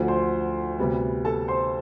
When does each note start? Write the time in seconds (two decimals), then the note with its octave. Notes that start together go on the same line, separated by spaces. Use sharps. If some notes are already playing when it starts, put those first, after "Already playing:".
Already playing: D2 D3 F3
0.08 C5 C6
0.79 D2 C3 G3 B3
1.25 A4 A5
1.48 C5 C6